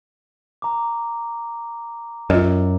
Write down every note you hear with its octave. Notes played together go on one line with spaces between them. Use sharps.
A#5 D6
F#2 F4 D#5